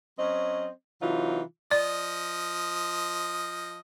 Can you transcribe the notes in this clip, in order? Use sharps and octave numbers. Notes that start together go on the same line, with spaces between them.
F#3 C4 C#4 D#5
C3 E3 F#3 D#4 F4
F3 D5 D#5